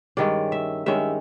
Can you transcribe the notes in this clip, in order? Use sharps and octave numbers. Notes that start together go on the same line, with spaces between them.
G2 D#3 G#3 C#4 D5
E5
G2 D#3 G#3 C#4 E5